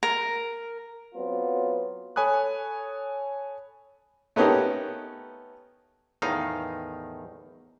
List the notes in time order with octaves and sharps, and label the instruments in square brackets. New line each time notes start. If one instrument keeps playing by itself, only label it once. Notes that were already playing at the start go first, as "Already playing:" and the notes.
[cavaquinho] A#4
[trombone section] F#3 B3 C4 F4
[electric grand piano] A4 C#5 G#5 B5 D#6 F#6
[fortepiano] A3 B3 C#4 D#4 G4 A#4
[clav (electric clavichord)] E2 A2 D#3 D#4 F5